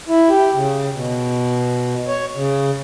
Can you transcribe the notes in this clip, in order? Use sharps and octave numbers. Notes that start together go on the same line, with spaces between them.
E4
G4
C#3
B2
C#5
C#3